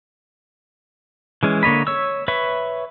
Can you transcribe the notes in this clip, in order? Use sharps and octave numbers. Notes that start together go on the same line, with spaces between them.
E3 G#3 C#4
D3 A#3 C#5 D#5 B5
C#5 E6
B4 C#5 E5